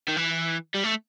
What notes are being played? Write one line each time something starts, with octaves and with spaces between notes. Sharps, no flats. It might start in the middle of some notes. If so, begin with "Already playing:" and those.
D#3
E3
G3
A3